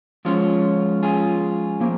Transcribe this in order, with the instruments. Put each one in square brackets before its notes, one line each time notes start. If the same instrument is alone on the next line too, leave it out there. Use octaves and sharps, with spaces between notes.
[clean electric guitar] F3 G#3 C#4 F4
F4 G#4
F3 A#3